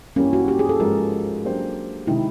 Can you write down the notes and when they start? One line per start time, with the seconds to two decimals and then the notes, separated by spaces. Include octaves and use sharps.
0.16 G2 E3 G3 A#3 C#4
0.33 F#4
0.48 G4
0.59 G#4
0.69 A4
0.80 G#2 F3 G#3 A#4
1.44 F#3 A#3 D4 G4 C5
2.07 C3 D#3 G#3 C4 E4